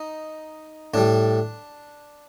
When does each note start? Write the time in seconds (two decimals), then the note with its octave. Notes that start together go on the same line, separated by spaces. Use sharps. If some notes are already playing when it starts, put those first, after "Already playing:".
Already playing: D#4
0.94 A2 G3 D4